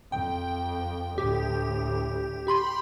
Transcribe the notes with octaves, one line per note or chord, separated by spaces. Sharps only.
F2 G5
D2 A2 G4
G4 B5 C6